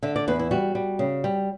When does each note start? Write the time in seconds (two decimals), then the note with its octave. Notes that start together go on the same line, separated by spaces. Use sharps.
0.03 D3 E5
0.16 D5
0.28 E2 B4
0.39 E4
0.51 G3 F#4
0.75 G3
0.99 C#3
1.24 G3